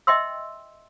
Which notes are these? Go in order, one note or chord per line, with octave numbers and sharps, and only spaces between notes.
D#5 E5 G5 C6 E6